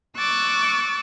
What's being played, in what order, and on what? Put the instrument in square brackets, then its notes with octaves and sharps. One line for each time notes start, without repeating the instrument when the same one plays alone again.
[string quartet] C#6 D6 E6 F#6 A6